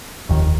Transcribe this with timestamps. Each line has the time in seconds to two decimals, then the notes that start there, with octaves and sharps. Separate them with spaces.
0.29 F1 D#2 D#3